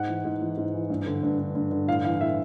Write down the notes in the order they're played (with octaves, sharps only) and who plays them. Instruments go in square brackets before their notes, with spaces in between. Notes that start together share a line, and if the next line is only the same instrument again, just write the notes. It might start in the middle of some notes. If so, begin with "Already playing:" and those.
Already playing: [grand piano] G#2 F#5
E3
G#2
E3
G#2
E3
G2
D3
G2
D3
G2
D3
A2 F5
E3 F5
A2 E5